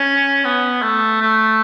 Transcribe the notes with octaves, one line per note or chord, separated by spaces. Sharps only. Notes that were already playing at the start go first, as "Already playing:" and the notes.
Already playing: C#4
B3
A3
A3